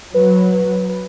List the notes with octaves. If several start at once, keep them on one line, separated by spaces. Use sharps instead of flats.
F#3 B4
B4
B4